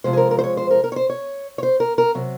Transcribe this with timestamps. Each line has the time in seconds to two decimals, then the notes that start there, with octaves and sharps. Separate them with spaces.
0.04 C3 F3 G#3 C5
0.13 G#4
0.17 A#4
0.31 A#4
0.39 C5
0.44 C#5
0.57 C5
0.71 A#4
0.84 A#4
0.92 C#5
0.96 C5
1.10 C#5
1.58 C#5
1.63 C5
1.80 A#4
1.98 A#4
2.15 C3 F#3